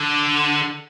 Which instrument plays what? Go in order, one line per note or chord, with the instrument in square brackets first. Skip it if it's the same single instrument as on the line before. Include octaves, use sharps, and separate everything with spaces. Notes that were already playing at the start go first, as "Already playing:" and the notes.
Already playing: [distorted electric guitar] D3